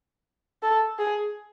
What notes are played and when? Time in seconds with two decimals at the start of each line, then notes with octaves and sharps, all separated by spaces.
0.63 A4
0.99 G#4